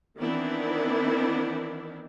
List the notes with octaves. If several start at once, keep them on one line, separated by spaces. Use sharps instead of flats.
D#3 E3 B3 C4 D4 E4